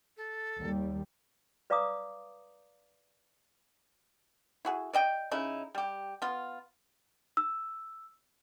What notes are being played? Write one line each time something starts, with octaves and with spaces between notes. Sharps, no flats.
A4
D#2 G3
B4 D5 F5 A#5 D6 D#6
E4 F#4 G#4
D5 D#5 G5
C#3 D#4 E4
G3 G4
B3 F4
E6